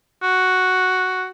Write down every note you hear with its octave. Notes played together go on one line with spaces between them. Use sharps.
F#4